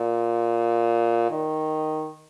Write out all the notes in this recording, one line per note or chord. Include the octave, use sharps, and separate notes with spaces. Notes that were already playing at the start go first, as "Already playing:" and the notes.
Already playing: A#2
D#3